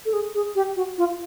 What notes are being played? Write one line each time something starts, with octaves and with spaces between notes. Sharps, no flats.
A4
G#4
G#4
G4
F#4
F4